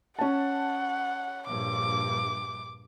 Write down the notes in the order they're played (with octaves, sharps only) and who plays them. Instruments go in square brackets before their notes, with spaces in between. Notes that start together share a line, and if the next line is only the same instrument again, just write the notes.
[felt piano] C#4 A5 [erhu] F#5
[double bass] A#1 G2 [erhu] D6